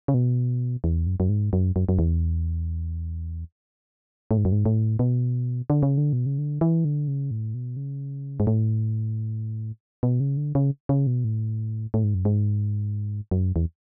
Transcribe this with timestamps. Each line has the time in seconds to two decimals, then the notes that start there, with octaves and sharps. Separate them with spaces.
0.08 C#3
0.14 B2
0.84 E2
1.07 F#2
1.20 F#2
1.29 G#2
1.53 F#2
1.76 F#2
1.89 F#2
1.99 E2
4.31 A2
4.37 G#2
4.45 F#2
4.52 G#2
4.66 A2
4.99 B2
5.70 D3
5.83 C#3
5.98 D3
6.13 B2
6.26 C#3
6.38 D3
6.61 E3
6.85 D3
7.08 C#3
7.31 A2
7.54 B2
7.77 C#3
8.40 G#2
8.47 A2
10.03 B2
10.20 C#3
10.37 D3
10.55 C#3
10.89 C#3
11.07 B2
11.24 A2
11.94 A2
12.04 G#2
12.15 F#2
12.25 G#2
13.31 F#2
13.56 E2